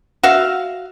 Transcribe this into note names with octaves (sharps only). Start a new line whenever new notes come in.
F#4 E5 F5